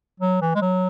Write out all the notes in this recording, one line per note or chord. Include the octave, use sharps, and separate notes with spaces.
F#3
E3
G#3
F#3